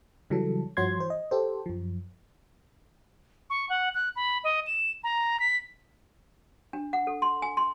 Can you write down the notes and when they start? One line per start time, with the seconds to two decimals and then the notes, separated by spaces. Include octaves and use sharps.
0.30 C#3 E3 F#3 G3 A4
0.77 G2 F3 F#4 C#5 C6 G#6
0.98 E3 C5
1.10 D#5
1.31 G4 A4 C5
1.66 F#2 F3
3.50 C#6
3.69 F#5
3.95 F#6
4.16 B5
4.44 D#5
4.67 E7
5.04 A#5
5.40 B6
6.73 D4
6.93 F#5
7.07 A4
7.22 C6
7.42 G#5
7.57 C6